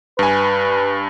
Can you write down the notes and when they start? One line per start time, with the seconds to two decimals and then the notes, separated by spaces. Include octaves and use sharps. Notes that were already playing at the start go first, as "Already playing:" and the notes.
0.19 G2 B4 G#5